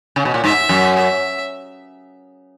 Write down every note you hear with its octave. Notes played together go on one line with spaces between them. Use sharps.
C#3
B2
A#2
G#2 E5
F#2
E5